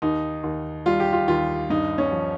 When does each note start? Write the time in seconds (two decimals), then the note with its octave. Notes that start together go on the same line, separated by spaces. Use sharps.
0.02 D#2 D#4
0.43 D#2
0.86 G3 F4
1.00 G4
1.13 F4
1.28 D#2 F4
1.70 G2 D#4
1.98 C#4
2.12 F3